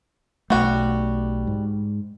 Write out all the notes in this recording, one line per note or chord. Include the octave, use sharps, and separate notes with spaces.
B1 G3 A3 F#4
G#2